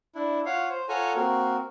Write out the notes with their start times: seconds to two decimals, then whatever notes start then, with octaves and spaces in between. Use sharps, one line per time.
0.15 D4 E4
0.46 F4 C#5 F5 F#5
0.70 C5
0.89 F4 A4 C#5 F#5 G#5 A#5
1.16 A#3 C4 F#4 A#4